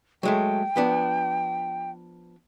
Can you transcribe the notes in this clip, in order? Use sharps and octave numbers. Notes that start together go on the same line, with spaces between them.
F#3 G#3 A3 G5
F3 B3 D4